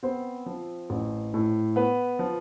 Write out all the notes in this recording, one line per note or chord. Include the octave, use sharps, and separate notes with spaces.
B3 C4 C5
F3
A1
A2
B3 B4
F3